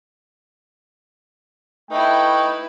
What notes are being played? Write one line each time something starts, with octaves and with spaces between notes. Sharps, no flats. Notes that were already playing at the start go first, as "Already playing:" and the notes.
A3 D#4 E4 B4 G5